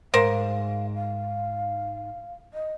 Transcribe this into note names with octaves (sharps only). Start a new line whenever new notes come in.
G#2 A#4 C5 F5
F5
D#5